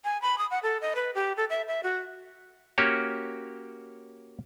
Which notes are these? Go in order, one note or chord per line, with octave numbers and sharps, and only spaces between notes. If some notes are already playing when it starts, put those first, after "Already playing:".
G#5
B5
D#6
F#5
A4
D#5
B4
G4
A4
E5
E5
F#4
A#3 C#4 F#4 G4 C#5